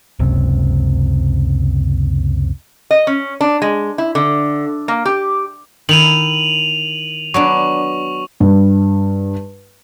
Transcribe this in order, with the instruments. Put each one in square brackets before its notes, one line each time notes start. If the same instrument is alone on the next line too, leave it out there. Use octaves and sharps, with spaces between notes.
[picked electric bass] F#1 C#2 C3
[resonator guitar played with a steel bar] D#5
C#4
D4
G#3
E4
D3
A#3
G4
[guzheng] D#3 D#4 E4 [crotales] D#7 F7 F#7
[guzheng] F#3 B3 D4 [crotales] C#6
[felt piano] G2